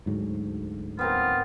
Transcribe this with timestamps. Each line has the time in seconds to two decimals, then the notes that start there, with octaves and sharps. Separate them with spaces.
0.06 D2 G#2 F#3
0.99 B3 C4 F4 A#4